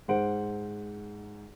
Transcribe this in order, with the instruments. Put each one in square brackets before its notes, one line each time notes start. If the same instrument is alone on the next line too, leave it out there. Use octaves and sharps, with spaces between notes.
[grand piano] G#2 C5 F#5 D7